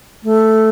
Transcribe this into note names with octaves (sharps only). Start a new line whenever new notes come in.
A3